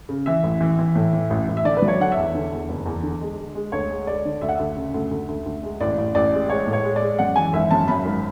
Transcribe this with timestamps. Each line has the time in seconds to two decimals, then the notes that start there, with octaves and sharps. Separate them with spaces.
0.09 C#3
0.26 E3 E5
0.43 A1
0.61 E3
0.79 E3
0.95 A2
1.13 E3
1.30 A1
1.48 A1
1.57 E5
1.64 D3 D5
1.77 B4
1.82 F#3
1.88 C#5
2.00 D3 F#5
2.12 E5
2.17 E2
2.34 D3
2.52 E2
2.69 F#1
2.86 E2
3.03 D3
3.21 G#3
3.38 G#3
3.55 G#3
3.72 D2 C#5
3.90 G#3
4.07 G#3 D5
4.25 D3
4.41 D2 E5
4.49 F#5
4.56 D2 E5
4.76 C#3
4.94 D2
5.11 D2
5.28 D2
5.46 D2
5.63 G#3
5.81 A1 D5
5.98 A1
6.15 A1 D5
6.33 G#3
6.49 G#3 C#5
6.67 A2
6.73 C#5
6.84 G#3
6.96 D5
7.02 G#3
7.19 F#2 F#5
7.36 E3 G#5
7.53 G#1 E5
7.71 F#2 A5
7.88 F#2 B5
8.05 G#1